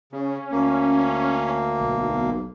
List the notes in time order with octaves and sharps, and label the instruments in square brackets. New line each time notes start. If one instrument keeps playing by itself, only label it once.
[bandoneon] C#3 [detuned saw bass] C#4
[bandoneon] D2 A#3
[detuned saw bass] B1